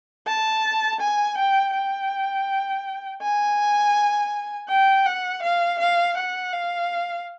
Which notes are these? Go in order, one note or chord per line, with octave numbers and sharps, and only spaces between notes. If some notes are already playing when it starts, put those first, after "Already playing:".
A5
G#5
G5
G5
G#5
G5
F#5
F5
F5
F#5
F5